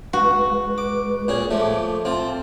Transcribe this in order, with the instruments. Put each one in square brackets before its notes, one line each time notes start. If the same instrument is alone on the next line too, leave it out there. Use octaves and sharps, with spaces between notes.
[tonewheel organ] G#3 B4 [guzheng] F#4
[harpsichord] D6
A#2 C#4 G#4
[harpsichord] F3 A3 [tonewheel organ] D6
[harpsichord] C4 F4 [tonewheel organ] A5